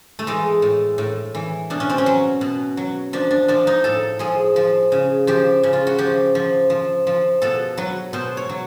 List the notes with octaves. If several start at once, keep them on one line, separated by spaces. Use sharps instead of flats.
A3
E3 G#3
A2
A2
E3
B2 D4
C#4
C4
C#4
F#3
B2
F#3
F3 D4
D4
F3 D4
D#4
A2 A4
F3 G#4
F3
C#3
F3 G4
C#3
F4
F#4
F3 G4
F3
F3
F3
B2 A4
F#3 B4
B2 C5
C#5
F#3